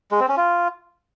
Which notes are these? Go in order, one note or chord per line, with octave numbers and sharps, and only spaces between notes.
G#3
C4
C#4
F4